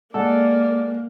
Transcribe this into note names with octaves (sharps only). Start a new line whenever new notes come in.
G#3 A#3 A4 D5 F#5